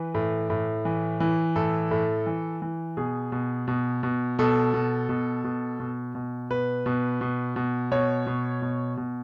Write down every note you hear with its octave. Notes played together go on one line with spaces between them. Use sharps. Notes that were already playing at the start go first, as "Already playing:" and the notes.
Already playing: E3 B4
A2
A2
E3
E3
A2 A4
A2
E3
E3
B2 G#4
B2
B2
B2
B2 A4
B2
B2
B2
B2
B2
B2 B4
B2
B2
B2
B2 C#5
B2
B2
B2